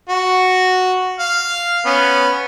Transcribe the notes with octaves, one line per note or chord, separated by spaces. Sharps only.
F#4
F5
B3 C#4